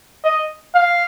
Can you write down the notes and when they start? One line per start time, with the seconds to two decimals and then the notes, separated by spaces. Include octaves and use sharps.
0.24 D#5
0.75 F5